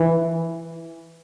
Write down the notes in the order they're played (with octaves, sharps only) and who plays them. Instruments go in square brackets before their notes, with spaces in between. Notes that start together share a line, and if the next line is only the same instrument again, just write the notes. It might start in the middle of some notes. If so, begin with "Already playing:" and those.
Already playing: [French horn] E3